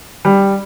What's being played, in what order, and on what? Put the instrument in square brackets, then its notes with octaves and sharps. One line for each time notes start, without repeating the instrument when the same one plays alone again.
[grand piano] G3